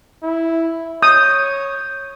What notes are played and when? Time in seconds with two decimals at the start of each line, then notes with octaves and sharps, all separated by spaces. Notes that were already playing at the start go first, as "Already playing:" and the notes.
0.23 E4
1.03 C#5 D#6 G6